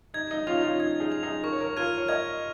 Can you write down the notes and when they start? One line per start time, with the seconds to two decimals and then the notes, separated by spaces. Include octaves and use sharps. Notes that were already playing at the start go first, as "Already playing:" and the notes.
0.14 D#4 G#6
0.31 D#4
0.47 C#4 F4 F7
0.57 D#4
0.63 C#4 F4
0.79 D#4 G#6
1.00 D#4 G#4
1.12 F7
1.23 D#4 G#4
1.43 A#4 C#6
1.53 C#5
1.61 A#4
1.69 C#5
1.77 F4 A#4 F6 G#6 D#7
1.97 C#5
2.08 A#4 D#5 G#6